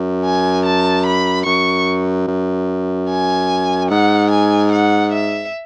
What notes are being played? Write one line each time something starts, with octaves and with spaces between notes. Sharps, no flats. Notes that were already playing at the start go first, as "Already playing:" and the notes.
Already playing: F#2
G#5
A5
B5
F#2 C#6
F#2
G#5
G#2 F#5
G#5
F#5
E5